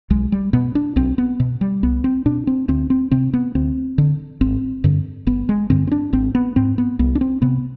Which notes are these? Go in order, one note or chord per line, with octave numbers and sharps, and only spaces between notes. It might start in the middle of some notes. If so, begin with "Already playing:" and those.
B1 G#3
G3
B2 B3
D4
B1 C4
B3
B2
G3
C2 B3
C4
B2 D4
C4
D2 C4
C4
C3 C4
B3
D2 C4
D3
G#1 C4
G2 D3
G1 B3
G#3
G2 D3 C4
C4
D4
G#1 C4
B3
G#2 C4
B3
C2 B3
D4
C4
C3 B3